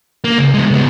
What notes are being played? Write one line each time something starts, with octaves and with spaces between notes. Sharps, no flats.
A#3
C#2
G#3 B3
C#2 B3